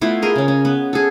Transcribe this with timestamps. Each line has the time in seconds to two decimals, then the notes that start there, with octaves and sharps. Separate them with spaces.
0.01 A3 B3 E4 F4
0.22 G#4 A#4 D#5
0.36 C#3 C#4
0.48 C#4
0.65 B3
0.93 G#4 A4